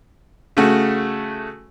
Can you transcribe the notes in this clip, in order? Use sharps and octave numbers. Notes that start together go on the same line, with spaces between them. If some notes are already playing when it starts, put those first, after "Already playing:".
C#3 A3 F#4